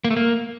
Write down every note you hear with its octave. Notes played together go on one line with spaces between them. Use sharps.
A#3
A3
A#3